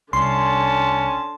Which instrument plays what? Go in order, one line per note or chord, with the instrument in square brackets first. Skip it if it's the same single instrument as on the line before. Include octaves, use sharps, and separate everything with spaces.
[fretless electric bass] C2 [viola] D3 A5 [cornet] C#4 [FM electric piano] C6